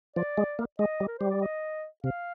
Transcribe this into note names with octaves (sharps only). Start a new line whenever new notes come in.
F3 D5
G#3
A#3
G#3 D#5
G3
A#4
G3 C5
D5
D#5
C3 F5